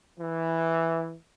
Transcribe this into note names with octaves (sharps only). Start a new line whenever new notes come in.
E3